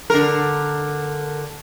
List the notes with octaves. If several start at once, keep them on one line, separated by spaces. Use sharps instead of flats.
D3 A#4